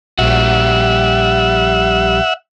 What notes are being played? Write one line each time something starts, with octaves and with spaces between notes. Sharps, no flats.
A#1 G3 F#4 E5 F#5